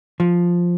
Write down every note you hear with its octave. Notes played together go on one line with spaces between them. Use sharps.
F3